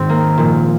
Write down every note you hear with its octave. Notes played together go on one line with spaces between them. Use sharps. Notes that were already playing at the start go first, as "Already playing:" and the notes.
Already playing: G#2 D#3 C4
A#3
A#2 F3